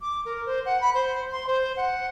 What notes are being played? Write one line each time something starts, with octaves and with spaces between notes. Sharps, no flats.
D6
A#4
C5
F#5
B5
C5
C6
C5
F#5